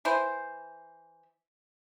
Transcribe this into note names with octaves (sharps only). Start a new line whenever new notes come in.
E3 E4 C5